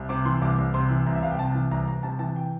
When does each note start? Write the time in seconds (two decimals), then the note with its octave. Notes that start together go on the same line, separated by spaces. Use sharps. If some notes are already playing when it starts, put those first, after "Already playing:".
Already playing: C2
0.09 C3 D6
0.25 E3 C6
0.42 C2 D6
0.58 C2
0.74 C3 C6
0.90 E3
1.06 C2 A#5
1.15 E5
1.22 C2 F5
1.31 G5
1.39 C3 A5
1.54 E3
1.71 C2 A#5
1.87 C2 A#5
2.03 C3 A5
2.19 E3 A5
2.36 G5